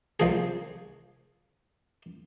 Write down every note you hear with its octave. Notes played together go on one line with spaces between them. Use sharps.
C2 F3 G#4